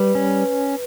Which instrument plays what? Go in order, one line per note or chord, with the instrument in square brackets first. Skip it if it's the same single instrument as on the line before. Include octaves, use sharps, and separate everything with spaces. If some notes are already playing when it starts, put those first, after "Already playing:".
Already playing: [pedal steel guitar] G3 [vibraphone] B4
[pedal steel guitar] C#4